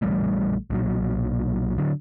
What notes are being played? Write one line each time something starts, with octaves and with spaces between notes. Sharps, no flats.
A#1 E3 G3 A3
B1 A#2 F#3
D3 F#3